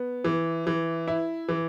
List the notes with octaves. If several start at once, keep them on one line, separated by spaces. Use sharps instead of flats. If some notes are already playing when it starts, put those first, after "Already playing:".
Already playing: B3
E3
E3
E4
E3